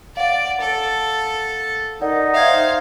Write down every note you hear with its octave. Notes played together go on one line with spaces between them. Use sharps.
D5 F5 F#5
A4
D#4 A#4 D5 F#5
C5 E5 F5 G#6